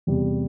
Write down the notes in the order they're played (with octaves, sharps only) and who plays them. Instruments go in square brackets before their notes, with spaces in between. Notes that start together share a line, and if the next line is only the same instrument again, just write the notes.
[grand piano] E2 C3 G3